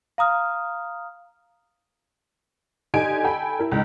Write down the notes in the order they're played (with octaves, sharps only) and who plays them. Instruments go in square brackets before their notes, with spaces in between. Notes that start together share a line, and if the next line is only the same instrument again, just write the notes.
[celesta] F5 A#5 D#6 F6
[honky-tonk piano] D3 D#4 G4 G#5 D7
A4 G5 G#5 B5
E4 A#4
C#2 D#4